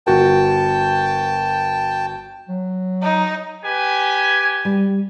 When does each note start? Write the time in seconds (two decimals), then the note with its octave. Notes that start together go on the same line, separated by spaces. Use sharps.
0.07 G1 F#4 A#4 G5 A5
2.49 F#3
3.03 D#4
3.64 G4 B4 G#5
4.65 G3